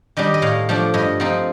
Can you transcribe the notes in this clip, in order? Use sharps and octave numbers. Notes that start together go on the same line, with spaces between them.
D#3 G3 D4 D#5
D#5
A2 F5
F3 A3 D4
G2 D#5
F3 C4 D#4